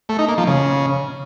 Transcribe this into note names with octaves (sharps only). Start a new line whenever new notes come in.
A3
D#4
A#3
F3
C#3